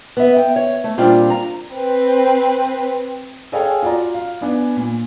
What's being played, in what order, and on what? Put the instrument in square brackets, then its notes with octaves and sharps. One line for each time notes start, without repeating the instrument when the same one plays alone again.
[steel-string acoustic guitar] B3 E5
G5
C#5
A3
A#2 G3 C4 D4 F4
A#5
[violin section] C4 B4
[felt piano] G#4 A4 C#5 F5 G5 G#5
F4 F#4 D5 A#5
F5
B3 D4 G#5
A#2